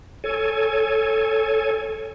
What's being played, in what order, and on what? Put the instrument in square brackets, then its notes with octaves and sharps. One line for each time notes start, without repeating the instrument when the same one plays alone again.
[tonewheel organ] A4 C#5 G#5